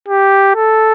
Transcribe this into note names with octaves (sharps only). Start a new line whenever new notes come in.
G4
A4